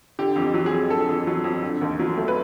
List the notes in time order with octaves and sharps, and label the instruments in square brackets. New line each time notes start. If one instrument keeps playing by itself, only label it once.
[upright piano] D3 G4
F2
G4
F#3
G#4
F2
D3 A4
F2
F#3
F2
D3
D#2
F#3
A3
B4